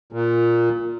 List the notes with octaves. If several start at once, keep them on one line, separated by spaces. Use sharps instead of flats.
A#2